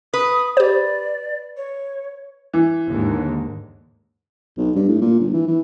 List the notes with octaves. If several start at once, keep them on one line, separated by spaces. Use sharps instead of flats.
B4 D#6
G4 C5 D5
C#5
E3
D#2 G#2 D3
B1
G2
A2
A#2
G1
E3
E3